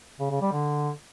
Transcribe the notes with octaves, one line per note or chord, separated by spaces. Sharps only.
C#3
C#3
G3
D3